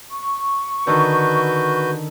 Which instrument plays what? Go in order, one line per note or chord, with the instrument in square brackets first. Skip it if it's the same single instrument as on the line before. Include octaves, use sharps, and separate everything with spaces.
[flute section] C#6
[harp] D3 D#3 [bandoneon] F#4 B4 G6